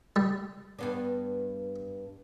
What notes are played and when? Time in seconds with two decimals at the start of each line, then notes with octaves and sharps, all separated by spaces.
0.16 G3
0.79 G2 B3 D4